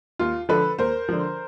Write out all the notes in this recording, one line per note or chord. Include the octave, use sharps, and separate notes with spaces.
D#2 F4
D3 F3 A4 B4
D#2 A#4 C5
D3 F3